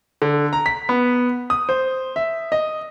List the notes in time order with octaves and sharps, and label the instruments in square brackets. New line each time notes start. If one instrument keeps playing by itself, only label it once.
[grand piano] D3
A#5
B6
B3
D#6
C5
E5
D#5